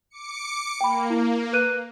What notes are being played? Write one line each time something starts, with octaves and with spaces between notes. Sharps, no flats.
D6 C#7
A#3 G5 B5
E4
B4 F#6 D#7